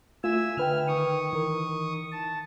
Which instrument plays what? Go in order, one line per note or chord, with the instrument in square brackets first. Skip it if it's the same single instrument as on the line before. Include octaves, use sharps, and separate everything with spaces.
[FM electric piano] A3 F4 [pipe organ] E5 G#5 E6
[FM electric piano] D3 B4 G5 [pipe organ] F6
[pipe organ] D#3 C#6 D#6
[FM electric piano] E3 A#4
[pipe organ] A5